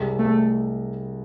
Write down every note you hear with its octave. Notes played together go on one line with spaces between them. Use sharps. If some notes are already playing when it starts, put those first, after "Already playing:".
Already playing: C2 C3 G#3
A3